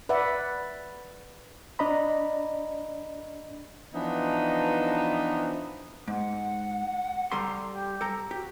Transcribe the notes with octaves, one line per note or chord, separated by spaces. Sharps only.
B4 D5 E5 F#5
D4 D5 D#5 A#5 B5
E3 F3 B3 D4 D#4
G#2 F#5
G3 A4 A#5 C6
G4
A4 A#5
F#4 G4